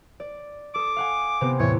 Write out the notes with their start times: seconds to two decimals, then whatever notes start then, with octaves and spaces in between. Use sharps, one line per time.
0.20 D5
0.75 A4 D6 D#6
0.96 F5 F#5 G#5
1.41 C3 B3 C4
1.59 E2 A2 C#5